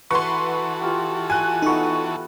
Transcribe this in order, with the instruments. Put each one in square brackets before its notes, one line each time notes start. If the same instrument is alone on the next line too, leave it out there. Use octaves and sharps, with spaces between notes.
[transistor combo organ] E3 F#4 A4 [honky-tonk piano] B4 F#5 C6 [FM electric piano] C#6
[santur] F4 G4
[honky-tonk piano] G#5 F#6
[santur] A3 B3 [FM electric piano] D#4 C#6